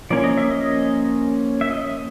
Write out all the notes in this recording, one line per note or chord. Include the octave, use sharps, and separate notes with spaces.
F3 A#3 C#4 D5
D#5
E5
D#5
E5
D#5